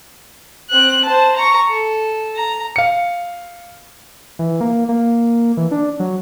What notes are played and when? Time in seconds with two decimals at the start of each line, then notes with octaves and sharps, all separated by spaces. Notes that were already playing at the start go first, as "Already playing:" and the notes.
0.70 C4 F#6
1.05 C5 A5
1.36 A#5 C#6
1.69 A4
2.36 A#5
2.76 F5 C#7
4.39 E3
4.61 A#3
4.89 A#3
5.57 E3
5.71 D4
6.00 F#3